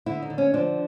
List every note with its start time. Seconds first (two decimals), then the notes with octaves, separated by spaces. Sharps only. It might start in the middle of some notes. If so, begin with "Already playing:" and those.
0.06 D3 E4
0.22 D#4
0.30 D3
0.38 C#4
0.54 F3 D4